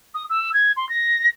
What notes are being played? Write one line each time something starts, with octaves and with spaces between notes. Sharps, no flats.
D#6
E6
G#6
C6
A#6